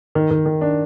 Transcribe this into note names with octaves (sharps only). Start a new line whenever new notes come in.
D#3
D#3
D#3
D4